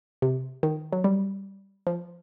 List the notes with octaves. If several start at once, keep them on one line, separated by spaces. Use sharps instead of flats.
C3
D#3
F#3
G3
F3